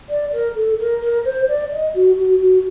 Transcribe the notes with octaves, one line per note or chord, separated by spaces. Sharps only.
D5
A#4
A4
A#4
A#4
C5
D5
D#5
F#4
F#4
F#4